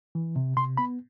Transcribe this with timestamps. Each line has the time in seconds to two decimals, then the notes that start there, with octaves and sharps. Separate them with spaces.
0.15 E3
0.36 C3
0.57 C3 C6
0.77 B3 B5